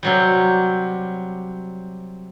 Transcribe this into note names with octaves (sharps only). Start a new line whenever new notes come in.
C3 F#3 G3